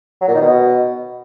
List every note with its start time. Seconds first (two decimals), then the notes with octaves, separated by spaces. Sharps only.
0.21 F#3
0.28 A#2
0.34 D#3
0.41 B2